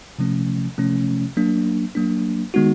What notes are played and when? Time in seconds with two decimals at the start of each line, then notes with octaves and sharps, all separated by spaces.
0.19 C3 F3 A3 C#4
0.78 C3 F3 A3 C#4
1.37 F#3 A#3 D4
1.95 F#3 A#3 D4
2.54 D#3 G#3 B3 D#4 F#4